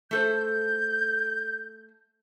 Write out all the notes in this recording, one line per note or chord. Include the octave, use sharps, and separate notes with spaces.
A3 A4 C5 G6